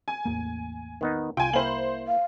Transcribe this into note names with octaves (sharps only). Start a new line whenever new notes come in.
G#5
A1 E2 A#3
D#3 B3 D#4
C2 F4 G5 G#5
A#3 E4 C5 F#7
F5